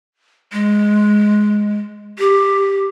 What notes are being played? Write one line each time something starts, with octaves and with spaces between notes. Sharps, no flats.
G#3
G4